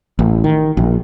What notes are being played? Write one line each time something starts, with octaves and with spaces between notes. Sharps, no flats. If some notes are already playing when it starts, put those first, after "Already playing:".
A1
D#3
A#1